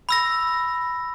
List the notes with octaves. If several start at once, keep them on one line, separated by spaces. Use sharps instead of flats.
B5 E6 A#6